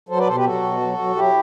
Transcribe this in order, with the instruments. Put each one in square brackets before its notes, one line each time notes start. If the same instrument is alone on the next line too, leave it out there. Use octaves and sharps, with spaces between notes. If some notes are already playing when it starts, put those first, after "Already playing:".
[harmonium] F#3 A4 C5
B4 D5
B2 A4 C5
G4 B4
F#3 F#4 A4
B2
F#3
F#3
F#3 E4 G4